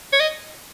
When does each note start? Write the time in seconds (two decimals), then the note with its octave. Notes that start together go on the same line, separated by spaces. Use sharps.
0.13 C#5
0.20 D#5